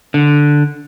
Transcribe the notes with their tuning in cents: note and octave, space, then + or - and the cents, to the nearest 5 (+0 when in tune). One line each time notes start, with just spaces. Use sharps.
D3 +0